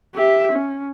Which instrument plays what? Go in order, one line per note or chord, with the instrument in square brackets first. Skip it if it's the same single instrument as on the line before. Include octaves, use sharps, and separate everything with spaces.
[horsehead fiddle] G4 E5
C#4